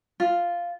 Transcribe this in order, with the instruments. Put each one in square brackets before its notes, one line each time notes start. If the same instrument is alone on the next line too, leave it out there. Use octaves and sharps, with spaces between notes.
[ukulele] F4